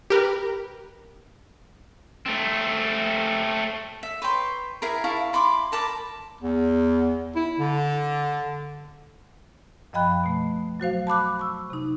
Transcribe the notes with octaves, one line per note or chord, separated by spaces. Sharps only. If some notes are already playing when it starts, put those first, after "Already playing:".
G4 A#4 B4
A3 C4
E5
B4 C#5 G5 C6
E4 G#4 A#4
E4 F5 A5 C#6
E4 B5 C6 D6
A#4 A5 B5 D6
E2
E4
D3
F#2 F3 D#5 G5 B5 F#6
B2 A3
F#3 F#4 C5 F5
A5 B5 D6 F#6
C#6 E6
C3 D#4